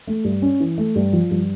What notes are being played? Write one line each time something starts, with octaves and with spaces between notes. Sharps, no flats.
A3
G2
C#4
E3
A3
G2
F3
G2